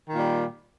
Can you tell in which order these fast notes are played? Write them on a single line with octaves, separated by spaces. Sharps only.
D#3 A#2 G3